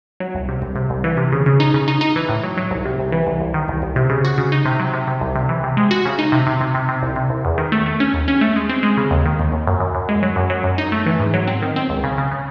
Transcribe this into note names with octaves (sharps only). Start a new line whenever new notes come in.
F#3
C2
C3
C2
C3
C2
E3
C3
C#3
C#3
D#4
C#3
D#4
D#4
E3
A2
F#3
F#3
C2
C3
C2
E3
C2
C2
D#3
C2
C2
C3
C#3
F#4
C#3
D#4
C3
F#3
C3
C3
C2
C3
E3
C3
G#3
F#4
C#3
D#4
C3
C3
C3
C3
C3
C2
C3
C2
E2
D#3
A3
A3
C#4
D#2
C#4
A3
G#3
C4
G#3
C#3
D#2
D#3
D#2
D#2
F#2
F#2
F#2
G#3
F#3
F#2
F#3
F#2
D#4
A3
E3
G#2
F#3
C4
D#3
C4
C#2
C#3
C#3
C#3